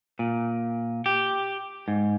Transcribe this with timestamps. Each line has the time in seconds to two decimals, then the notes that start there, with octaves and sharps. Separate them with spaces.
0.19 A#2
1.06 G4
1.88 G#2